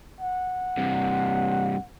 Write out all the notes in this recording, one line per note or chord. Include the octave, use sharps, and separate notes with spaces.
F#5
G2 C3